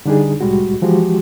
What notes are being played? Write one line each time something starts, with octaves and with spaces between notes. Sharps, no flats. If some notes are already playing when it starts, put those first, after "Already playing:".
D3 G3 D4 D#4 G#4
C2 A2 G3 G#3 F#4
E3 F3 G#3 F#4 G4